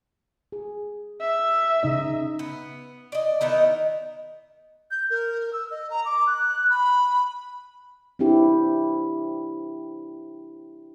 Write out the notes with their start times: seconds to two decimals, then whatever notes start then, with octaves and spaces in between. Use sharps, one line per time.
0.52 G#4
1.21 E5
1.83 C#3 D#4 D#5
2.39 B3
3.12 D5 D#5
3.41 D#3 B3 D#4 E4
4.91 G6
5.10 A#4
5.53 E6
5.71 D#5
5.91 A#5
6.05 D6
6.27 F#6
6.70 B5
8.19 C4 D4 E4 G4